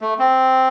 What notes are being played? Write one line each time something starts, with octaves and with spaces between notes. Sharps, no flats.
A3
C4